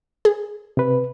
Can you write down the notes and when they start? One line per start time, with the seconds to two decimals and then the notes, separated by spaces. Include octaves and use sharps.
0.25 G#4
0.77 C3 B4